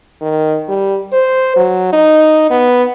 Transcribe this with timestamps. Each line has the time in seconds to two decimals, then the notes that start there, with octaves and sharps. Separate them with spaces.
0.21 D#3
0.69 G3
1.13 C5
1.56 F#3
1.93 D#4
2.50 B3